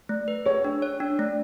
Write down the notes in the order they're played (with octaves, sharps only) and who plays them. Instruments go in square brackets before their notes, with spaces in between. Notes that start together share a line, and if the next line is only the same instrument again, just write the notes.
[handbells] A3
B4
[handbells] G#4 [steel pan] C#5
[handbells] D4
C#5
D4
A3